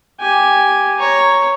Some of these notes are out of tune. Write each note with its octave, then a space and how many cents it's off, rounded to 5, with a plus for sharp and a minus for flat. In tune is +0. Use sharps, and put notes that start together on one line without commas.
G4 +0 G#5 +0
C#5 +0 A#5 +0